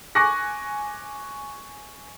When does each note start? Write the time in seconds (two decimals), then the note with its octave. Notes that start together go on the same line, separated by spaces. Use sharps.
0.15 G#5 C#6 D6 F#6 A#6